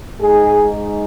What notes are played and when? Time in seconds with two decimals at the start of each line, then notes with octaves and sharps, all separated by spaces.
0.20 G#2 G#3 D#4 G#4